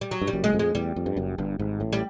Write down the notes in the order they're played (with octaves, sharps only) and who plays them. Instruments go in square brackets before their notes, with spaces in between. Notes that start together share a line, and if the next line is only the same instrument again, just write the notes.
[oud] G3
F#3
[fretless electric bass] G2
[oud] G3
[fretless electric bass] F#1 F#2
[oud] G#3
[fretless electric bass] F2
[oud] G#3
[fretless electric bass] E2 [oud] G3
[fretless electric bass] F2
G2
F#1 F#2
G1 G2
G#1 G#2
A1 A2
[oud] G3